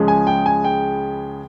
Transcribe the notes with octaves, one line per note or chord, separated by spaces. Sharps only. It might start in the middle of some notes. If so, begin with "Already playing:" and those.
Already playing: C#2 C#3 F3 G#3
G#5
G5
G#5
G5